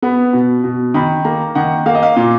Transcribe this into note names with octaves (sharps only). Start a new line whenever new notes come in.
B3 B5
B2
B2
D#3 B5
A#3 A#5
D#3 F#5
A#3 F5
D#5
F5
A#2